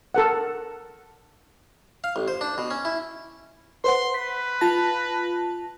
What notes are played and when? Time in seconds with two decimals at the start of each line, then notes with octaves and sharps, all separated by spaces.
0.15 A4 A#4 F#5
2.04 F5
2.16 A1
2.28 C5
2.41 D4
2.58 B2
2.71 C#4
2.85 E4
3.84 B4 C5 F#5 C6
4.14 B4 B6
4.61 F4 A5 A#6